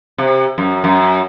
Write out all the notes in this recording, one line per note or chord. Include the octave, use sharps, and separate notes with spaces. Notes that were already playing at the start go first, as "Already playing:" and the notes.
C3
F#2
F#2